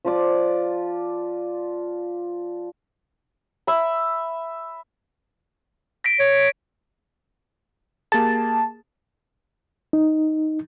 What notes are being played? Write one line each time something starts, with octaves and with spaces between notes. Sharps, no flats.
F3 F4 D5
E5 B5
A#6 B6 D7
C#5
A#3 G4 G#4 A5
D#4